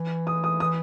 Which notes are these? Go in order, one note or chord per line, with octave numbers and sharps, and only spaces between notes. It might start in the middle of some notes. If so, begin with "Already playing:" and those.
Already playing: E3
D#6
D#6
E3 D#6